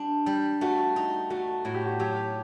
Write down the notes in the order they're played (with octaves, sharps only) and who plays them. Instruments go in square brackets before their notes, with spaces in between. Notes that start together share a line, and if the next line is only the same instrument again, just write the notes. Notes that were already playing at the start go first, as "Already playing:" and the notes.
Already playing: [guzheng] G3 D4
G3
[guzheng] A3 [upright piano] F#4
[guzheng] D#4
[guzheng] A3 [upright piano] F#4
[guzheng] A2 [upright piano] F#4
[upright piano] G4
F#4
[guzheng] F#3 [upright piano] G4